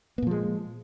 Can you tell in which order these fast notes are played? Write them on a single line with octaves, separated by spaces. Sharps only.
B3 A#2 F3 G#3